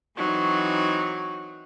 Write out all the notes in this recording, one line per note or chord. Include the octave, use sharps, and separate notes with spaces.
E3 F#3 C4 D#4